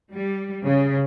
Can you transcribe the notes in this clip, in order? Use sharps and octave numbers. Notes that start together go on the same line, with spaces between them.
G3
C#3